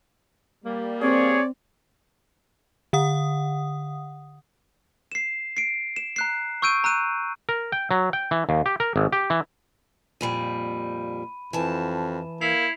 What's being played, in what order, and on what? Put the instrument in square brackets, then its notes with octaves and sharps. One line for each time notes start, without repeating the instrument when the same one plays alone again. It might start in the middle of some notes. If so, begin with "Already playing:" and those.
[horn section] G3 A#3
[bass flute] C4 [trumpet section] G#4 C#5 [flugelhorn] D5
[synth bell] D3 F#5 D#6
[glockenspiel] C7 E7
C7 D7
E7
A#5 F#6 C7
C#6 E6 G6 D7 D#7
A#5 E6 F#6 D#7
[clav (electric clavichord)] A#4
G5
F#3
G5
E3
D#2
G4
A#4
G#1
G4
E3
[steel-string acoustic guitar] F2 A#2 G3 [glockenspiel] B5 D#7
[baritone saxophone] F2 [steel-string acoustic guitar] E3 A5
[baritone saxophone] A#3 [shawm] E4 [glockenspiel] G#6 C7 F7